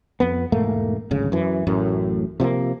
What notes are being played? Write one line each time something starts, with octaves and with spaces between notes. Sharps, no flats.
F2 B3
E1 G#2 A3 A#3
D1 G#1 C#3
F#2 E3
A1 F#2 A2
C3 F3 F#3 A#3